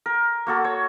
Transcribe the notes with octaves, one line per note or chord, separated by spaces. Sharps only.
A#4
A#3 F#4 A4
C#5